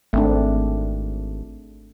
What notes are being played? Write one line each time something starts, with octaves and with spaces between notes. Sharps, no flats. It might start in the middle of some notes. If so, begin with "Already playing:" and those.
G#1 A3 C4 D4